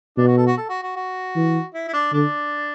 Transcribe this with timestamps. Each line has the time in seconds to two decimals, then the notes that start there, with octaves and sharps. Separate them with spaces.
0.18 B2 D4
0.27 F#4
0.37 A4
0.47 F#4
0.57 A4
0.69 F#4
0.83 F#4
0.96 F#4
1.35 E3
1.74 E4
1.88 E4
1.93 D4
2.13 D3 D4